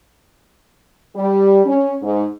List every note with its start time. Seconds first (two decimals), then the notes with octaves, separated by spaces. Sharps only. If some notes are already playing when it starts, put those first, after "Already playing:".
1.16 G3
1.66 C#4
2.02 G#2